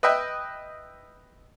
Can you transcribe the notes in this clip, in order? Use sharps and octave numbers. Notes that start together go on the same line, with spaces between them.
B4 D#5 E5 G5